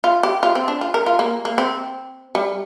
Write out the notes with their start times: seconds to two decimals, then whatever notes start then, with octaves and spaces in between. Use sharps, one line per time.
0.04 F4
0.23 G4
0.43 F4
0.55 C4
0.68 D4
0.81 F4
0.94 A#4
1.06 F4
1.19 A#3
1.45 A#3
1.58 C4
2.35 G3